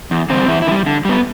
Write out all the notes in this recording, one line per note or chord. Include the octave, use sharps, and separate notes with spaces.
E2
D3 G3 C4 C5
E2 E4
E4
D3
G3
D3
G3 B3